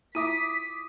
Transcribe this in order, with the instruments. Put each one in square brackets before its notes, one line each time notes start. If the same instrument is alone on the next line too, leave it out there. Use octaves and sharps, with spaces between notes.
[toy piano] E4 F4 E5 [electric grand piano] D6 D#6 D#7 [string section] B6